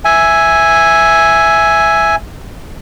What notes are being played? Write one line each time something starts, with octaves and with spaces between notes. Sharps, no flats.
E5 G#5